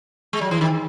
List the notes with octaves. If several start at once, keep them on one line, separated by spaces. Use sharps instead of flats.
G#3
F#3
E3
D#3